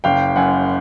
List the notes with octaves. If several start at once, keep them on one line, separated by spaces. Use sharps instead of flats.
F#1 F5 G5
F#2 F#5 G#5